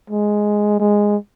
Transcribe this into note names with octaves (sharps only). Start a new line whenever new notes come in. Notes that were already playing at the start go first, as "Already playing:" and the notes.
G#3
G#3